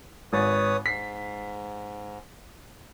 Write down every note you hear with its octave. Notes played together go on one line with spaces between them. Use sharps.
G#1 B4 C#5 D#6 A6
G#2 B6 C7